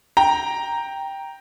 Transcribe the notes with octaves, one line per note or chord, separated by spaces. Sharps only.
G5 A#5